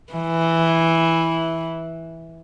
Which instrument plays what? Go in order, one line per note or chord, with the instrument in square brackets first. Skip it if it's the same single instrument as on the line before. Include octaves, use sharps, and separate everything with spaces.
[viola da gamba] E3